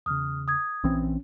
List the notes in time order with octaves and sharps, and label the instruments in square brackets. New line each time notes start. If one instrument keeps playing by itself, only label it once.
[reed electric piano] E2 C#3 [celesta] D#6 F6
[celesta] D#6 G#6
[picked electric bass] A#1 E3 C4 [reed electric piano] C#4